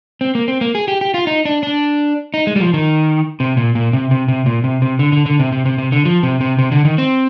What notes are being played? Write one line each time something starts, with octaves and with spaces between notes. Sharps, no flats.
C4
A#3
C4
A#3
G#4
G4
G4
F4
D#4
D4
D4
D#4
G#3
G3
F3
D#3
C3
A#2
A#2
C3
C3
C3
A#2
C3
C3
D3
D3
D3
C3
C3
C3
C3
D3
F3
C3
C3
C3
D3
D#3
C4